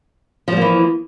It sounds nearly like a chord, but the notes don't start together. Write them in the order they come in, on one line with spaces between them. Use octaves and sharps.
F3 G3 A#3 E3